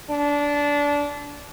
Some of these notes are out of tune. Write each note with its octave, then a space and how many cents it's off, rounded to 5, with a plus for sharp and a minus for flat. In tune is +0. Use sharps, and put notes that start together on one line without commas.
D4 -20